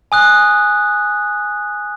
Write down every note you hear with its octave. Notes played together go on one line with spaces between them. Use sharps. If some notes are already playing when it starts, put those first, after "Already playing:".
G#5 D#6 F#6